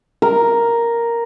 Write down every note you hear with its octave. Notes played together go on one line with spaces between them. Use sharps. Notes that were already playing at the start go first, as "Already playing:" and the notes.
A#4